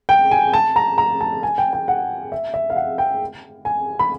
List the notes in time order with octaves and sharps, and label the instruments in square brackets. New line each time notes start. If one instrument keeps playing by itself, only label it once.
[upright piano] G5
G#5
A5
A#5
A#5
A5
G#5
G5
G5
F#5
E5
E5
F5
F#5
G5
G#5
B5